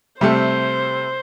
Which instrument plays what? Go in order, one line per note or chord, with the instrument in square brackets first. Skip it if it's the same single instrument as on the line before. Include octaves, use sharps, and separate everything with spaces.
[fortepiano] C3 G3 A3 [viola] C5